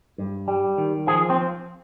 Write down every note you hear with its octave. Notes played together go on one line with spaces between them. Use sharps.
G2
G3
D#3
F3 G#4
C4